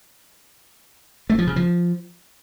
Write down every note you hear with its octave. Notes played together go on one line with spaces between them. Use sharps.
A3
F3
C#3
F3